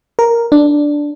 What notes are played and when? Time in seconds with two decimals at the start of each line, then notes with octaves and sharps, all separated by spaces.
0.19 A#4
0.52 D4